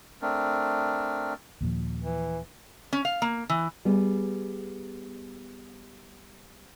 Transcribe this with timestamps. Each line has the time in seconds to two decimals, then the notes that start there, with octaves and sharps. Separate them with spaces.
0.22 A3 C4 D4 A#4
1.61 D#2 A#2 F3
2.03 E3
2.93 C#4
3.05 F5
3.22 A#3
3.50 E3
3.85 G3 B3 G#4